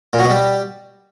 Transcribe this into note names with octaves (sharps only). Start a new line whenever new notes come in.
A#2
F#3
B2
G3